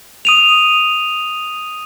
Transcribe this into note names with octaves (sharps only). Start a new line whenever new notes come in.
D#6 D#7 F7